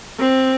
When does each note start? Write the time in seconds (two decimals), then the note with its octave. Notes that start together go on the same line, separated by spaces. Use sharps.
0.19 C4